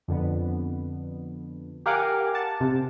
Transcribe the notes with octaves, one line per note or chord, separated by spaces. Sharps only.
F2 D3 B3
G4 A#4 F5 F#5 G#5 D6
F#5 A5
C3